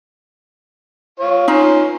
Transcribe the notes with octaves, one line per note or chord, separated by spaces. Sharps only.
F4 C#5
C#4 D#4 F4 C6